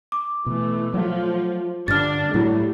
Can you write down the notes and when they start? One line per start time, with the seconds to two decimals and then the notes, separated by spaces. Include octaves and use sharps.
0.12 D6
0.46 B2 E3 A3
0.94 F3 F#3 A3 F4
1.88 G2 D3 D4 F6 A6
2.34 A2 F#3 G3 A3 E4